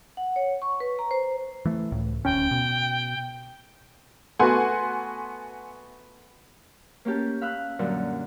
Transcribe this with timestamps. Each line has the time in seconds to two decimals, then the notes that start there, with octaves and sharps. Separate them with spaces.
0.17 F#5
0.36 C#5
0.62 C#6
0.80 B4
0.99 A#5
1.11 C5
1.65 E3 A3
1.92 C#2 A2
2.25 D#1 D2 C#4 G5
2.51 B2
4.39 A3 B3 F#4 F#5 G#5 C6
7.05 A#3 C#4 G4 A5
7.41 F5 B5 E6 F#6
7.79 F#2 A#2 D3 G3